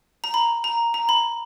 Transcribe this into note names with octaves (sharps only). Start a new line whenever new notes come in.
A#5
B5
A#5
A#5
B5